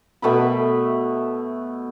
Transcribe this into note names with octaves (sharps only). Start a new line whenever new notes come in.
B2 A3 E5 B5